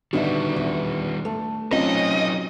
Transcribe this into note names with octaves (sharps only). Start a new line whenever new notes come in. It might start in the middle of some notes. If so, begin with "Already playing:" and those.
D3 D#3 G3 B3 D4 D#4 F#4 E5
E2
A3
F#3 C4 C#4 D#4 F4 D#5